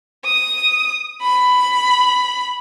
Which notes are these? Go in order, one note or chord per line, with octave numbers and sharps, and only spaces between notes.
D#6
B5